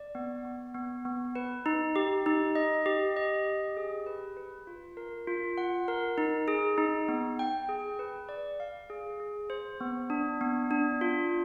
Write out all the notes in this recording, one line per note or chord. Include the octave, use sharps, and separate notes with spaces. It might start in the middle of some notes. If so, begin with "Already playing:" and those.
Already playing: D5
B3
B3
B3
B3
B4
D#4
G4
D#4
D#5
G4
D#5
G4
G#4
B4
B4
F4
A#4
F4
F#5
A#4
D#4
G#4
D#4
B3
G5
G#4
B4
D5
F5
G#4
G#4
C5
B3
D4
B3
D4
F4